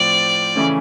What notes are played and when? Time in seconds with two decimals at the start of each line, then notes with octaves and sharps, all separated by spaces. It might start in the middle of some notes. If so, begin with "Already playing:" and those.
Already playing: A2 F3 C4 D5
0.56 C#3 E3 A3 C#4